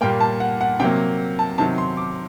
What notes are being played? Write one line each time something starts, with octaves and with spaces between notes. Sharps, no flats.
A#2 G3 A#3 G5
A5
F#5
F#5
C3 F#3 A#3 G5
A5
C3 D#3 F#3 A5
C6
D6